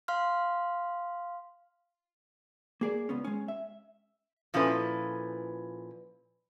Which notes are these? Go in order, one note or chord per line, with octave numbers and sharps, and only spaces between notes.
F5 C6 F6
A#3 G#4 D5
C#2 B3 C#4
G#3 C#4
E5
A#2 F3 C#4 E4 A4 B4